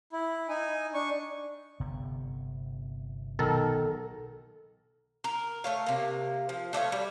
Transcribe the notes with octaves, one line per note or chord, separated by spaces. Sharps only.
E4
D#4 G#5
D4 C#6
G1 C3 B3
B1 D#3 A4 A#4
A#4
A3 C#5 F5
C3 A#3
F3
A3 D4 F4 C#5
G3